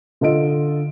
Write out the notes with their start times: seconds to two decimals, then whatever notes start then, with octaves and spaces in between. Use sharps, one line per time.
0.21 D3 F4 A4 D#5 D7